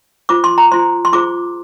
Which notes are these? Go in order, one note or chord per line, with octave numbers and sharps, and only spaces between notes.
F4 C5 D6
C6
A#5
F4 C5 C6
C6
F4 G#4 C5 D6